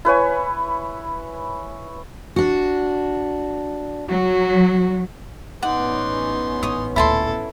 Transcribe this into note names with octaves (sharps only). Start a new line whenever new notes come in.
E4 B4 C#5 G#5
D4 F#4
F#3 F#4
A1 B3 C#4 D#4 D5 F#5 C6
A2 C#5 D#6
D2 A#2 E4 A4 A5 C6